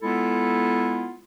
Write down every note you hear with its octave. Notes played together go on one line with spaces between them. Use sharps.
G#3 B3 E4 F4 A4